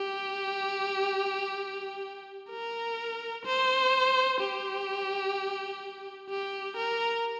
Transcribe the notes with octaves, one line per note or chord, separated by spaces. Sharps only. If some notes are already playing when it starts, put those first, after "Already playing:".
Already playing: G4
A#4
C5
G4
G4
A#4